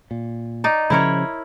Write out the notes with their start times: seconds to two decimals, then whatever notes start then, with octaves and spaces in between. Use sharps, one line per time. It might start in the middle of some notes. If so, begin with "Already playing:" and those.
0.11 A#2
0.64 D#4 D5
0.90 C#3 F3 C#4 E4 A#4 C#5